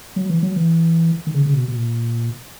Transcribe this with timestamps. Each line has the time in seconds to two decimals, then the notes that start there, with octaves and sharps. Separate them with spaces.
0.16 F#3
0.29 E3
0.42 F#3
0.56 E3
1.27 D#3
1.34 C#3
1.45 C#3
1.54 B2
1.68 B2
1.73 A#2